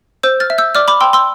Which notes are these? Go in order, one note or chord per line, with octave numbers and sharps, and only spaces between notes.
C5 E6 G6
F6 A6
E5
E6 G6
D5 D6 F6
B5 D6
G5 C6 E6
C6 E6